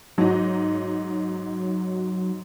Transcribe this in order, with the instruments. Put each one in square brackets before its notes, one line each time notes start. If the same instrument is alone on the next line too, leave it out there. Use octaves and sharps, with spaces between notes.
[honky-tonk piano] G#2 D#4 [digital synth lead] F#3